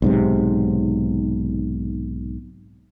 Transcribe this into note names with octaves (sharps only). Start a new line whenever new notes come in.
B1 G#2 C3